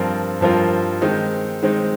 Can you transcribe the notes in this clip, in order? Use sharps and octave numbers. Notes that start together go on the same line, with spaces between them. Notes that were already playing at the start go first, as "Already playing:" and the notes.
Already playing: G2 F3 C4 F4 A#4
G2 F3 C4 F4 A#4
D#3 G#3 C4 D#4
D#3 G#3 C4 D#4